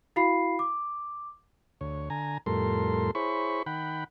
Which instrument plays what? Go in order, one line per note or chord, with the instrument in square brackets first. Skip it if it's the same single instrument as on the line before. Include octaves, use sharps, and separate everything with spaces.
[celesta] E4 F#4 F5 B5 C7
D6
[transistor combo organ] D2 C#5
D3 G#5 A#5
F2 A2 G3 A4 A#4 C6
E4 G#4 C5 C#5 B5 C#6
D#3 F#5 G5 B5